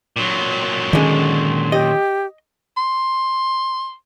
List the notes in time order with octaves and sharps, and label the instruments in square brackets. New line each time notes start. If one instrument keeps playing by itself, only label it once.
[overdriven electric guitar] A#2 F#3
[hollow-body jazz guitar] D3 G#3 [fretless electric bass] D#3 C#4
[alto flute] G4 [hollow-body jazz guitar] D#5
[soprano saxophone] C6